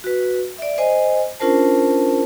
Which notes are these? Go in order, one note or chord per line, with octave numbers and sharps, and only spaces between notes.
F#4 B4
D5 E5
C5 D#5 G#5
C#4 D4 F4 A#4 C5 A5